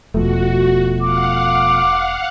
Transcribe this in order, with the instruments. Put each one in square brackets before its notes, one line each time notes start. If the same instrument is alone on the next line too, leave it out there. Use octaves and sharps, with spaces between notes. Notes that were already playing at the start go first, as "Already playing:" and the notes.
[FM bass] E1 [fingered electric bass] B2 F3 A3 [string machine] F#4
[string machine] F5 F#5 [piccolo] D6